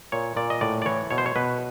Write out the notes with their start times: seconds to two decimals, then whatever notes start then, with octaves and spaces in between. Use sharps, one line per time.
0.12 A#2 C#5
0.36 A#2 D5
0.50 D#5
0.61 A2 D5
0.82 D5
0.86 E3 C#5
1.10 B2 C#5
1.18 C5
1.26 C#5
1.36 B2 B4